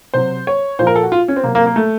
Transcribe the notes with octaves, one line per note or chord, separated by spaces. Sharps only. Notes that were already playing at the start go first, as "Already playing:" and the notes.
C3 F#3 C5
C#5
A#2 F3 C5
A#4
A4
F#4
F4
C#4
C4
C3 F#3 A#3
A#3
A#3
A3